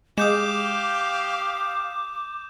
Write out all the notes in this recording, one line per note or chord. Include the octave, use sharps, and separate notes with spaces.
G#3 G4 F5 D6 D#6 G6 E7